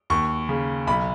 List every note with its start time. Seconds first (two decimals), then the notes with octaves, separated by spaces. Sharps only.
0.10 D#2 C#6
0.49 C#3
0.87 B1 B5